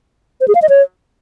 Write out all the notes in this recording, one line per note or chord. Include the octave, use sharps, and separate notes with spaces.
C5
G#4
F5
D#5
C#5